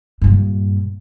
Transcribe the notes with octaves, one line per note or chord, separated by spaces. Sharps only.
G2 A#2